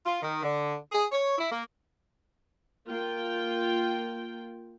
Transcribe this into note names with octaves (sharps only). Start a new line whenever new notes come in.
F4
D#3
D3
G#4
C#5
E4
A#3
A#3 F4 G5